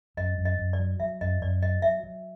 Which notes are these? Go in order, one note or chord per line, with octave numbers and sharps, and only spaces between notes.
F#2 D#5
F#2
D#5
F#2
D5
F#3
F#3 E5
F#2 D#5
F#2 D5
F#3 D#5
F#3 E5
F#3